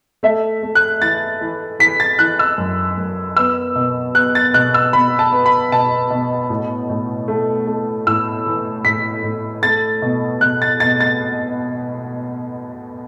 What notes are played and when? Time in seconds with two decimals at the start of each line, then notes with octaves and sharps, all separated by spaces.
0.23 A3 E5
0.63 A3
0.75 F#6
1.02 E3 A6
1.41 E3
1.80 E3 B6
2.00 A6
2.19 E3 F#6
2.39 E6
2.58 F#2
2.97 F#2
3.37 B3 E6
3.75 B2
4.15 B3 F#6
4.35 A6
4.54 B2 F#6
4.74 E6
4.93 B2 B5
5.19 A5
5.32 B3
5.46 B5
5.72 B2 A5
6.10 B2
6.50 A2
6.90 A2
7.28 A3
7.67 A3
8.07 A2 E6
8.47 E3
8.85 A2 B6
9.24 A2
9.63 A3 A6
10.02 B2
10.41 B2 F#6
10.62 A6
10.80 B2 A6
11.01 A6